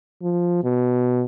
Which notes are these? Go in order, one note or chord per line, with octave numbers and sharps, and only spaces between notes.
F3
B2